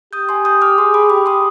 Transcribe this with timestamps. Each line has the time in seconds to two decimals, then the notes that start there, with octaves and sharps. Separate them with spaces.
0.13 G4 D#6 G6
0.29 G#5 C6
0.45 D#6 G6
0.61 D6 F6
0.78 G#4 C6 D#6
0.94 B5 D6
1.10 G4 B5 D6
1.26 C6 D#6